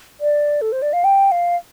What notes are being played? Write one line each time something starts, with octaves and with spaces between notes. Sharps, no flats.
D5
A4
C5
D5
F5
G5
F5